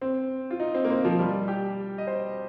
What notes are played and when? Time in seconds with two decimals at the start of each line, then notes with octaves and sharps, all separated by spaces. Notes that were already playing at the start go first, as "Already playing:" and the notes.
0.01 C4
0.51 F4
0.60 D#4
0.75 C4
0.85 A#3
0.90 C4
1.05 F3
1.19 G3
1.48 G4
1.98 D#5
2.07 C5